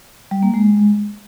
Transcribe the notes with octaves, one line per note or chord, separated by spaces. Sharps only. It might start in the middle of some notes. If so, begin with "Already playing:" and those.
G3
A#3
G#3